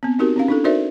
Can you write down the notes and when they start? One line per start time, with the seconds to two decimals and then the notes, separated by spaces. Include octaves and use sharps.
0.03 B3 C4
0.19 C4 D#4 F#4 G4 A#4
0.36 C4 C#4 F5
0.48 D4 E4 A4
0.64 D#4 F#4 A#4 C5 D5 E5